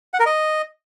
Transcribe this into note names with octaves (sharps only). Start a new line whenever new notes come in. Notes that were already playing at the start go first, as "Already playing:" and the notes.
F#5
A#4
D#5